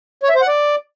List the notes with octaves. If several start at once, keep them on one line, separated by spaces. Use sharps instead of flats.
C#5
E5
C5
F#5
D5